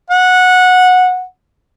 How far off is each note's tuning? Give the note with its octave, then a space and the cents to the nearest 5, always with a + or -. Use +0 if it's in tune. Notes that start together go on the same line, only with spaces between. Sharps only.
F#5 -15